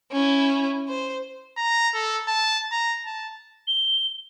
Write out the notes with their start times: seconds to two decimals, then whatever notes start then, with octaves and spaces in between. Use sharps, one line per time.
0.12 C#4 E4
0.89 C5
1.57 A#5
1.94 A4
2.28 A5
2.72 A#5
3.06 A5
3.67 G7